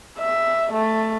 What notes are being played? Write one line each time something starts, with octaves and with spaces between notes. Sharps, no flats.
E5
A3